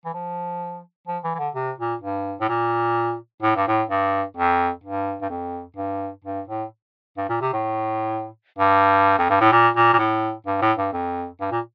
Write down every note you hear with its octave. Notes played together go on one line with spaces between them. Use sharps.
E3
F3
F3
E3
E3
D3
C3
A#2
G2
A2
A#2
A2
G2
A2
G2
F2
G2
G2
F2
G2
G2
A2
G2
A#2
C3
A2
G2
F2
G2
A2
A#2
A#2
A#2
A2
G2
A2
G2
F2
G2
A#2